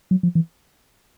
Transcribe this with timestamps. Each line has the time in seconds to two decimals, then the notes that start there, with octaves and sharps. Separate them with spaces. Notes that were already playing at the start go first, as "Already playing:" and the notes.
0.11 F#3
0.23 F3
0.35 E3